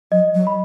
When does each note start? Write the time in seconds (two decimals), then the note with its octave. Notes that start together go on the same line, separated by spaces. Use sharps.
0.12 F#3 D#5
0.35 F#3
0.47 B5